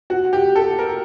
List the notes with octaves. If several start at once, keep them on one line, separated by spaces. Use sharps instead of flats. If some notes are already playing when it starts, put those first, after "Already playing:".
F#4
G4
A4
A#4